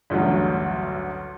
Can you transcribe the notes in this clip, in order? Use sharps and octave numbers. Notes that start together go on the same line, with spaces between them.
A1 D2 G2 F#3